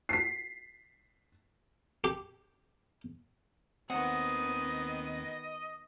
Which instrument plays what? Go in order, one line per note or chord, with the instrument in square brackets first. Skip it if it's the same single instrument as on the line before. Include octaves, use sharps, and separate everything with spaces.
[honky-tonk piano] B6 C7
[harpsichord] G4
[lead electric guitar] D#2 C4 [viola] D#3 B3 [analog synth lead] D#5 [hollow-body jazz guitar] F#5